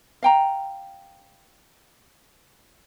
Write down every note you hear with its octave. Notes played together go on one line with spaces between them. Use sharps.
F5 G5 A#5